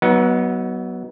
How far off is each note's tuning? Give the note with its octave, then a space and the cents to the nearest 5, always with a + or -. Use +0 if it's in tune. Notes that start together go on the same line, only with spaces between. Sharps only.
F#3 +20 B3 -15 D#4 +25